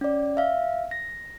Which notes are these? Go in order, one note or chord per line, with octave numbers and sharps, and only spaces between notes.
C#4 D5
E5 F5
A#6